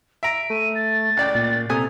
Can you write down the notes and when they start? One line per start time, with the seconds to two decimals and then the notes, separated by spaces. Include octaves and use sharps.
0.23 E5 A#5 D7
0.50 A3 D#7
0.75 A6
1.17 C#2 D5 G5
1.35 A#2
1.69 C3 A3 G#5 A#5 D#6